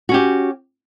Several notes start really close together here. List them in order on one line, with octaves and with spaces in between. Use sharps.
F#4 C#4 G4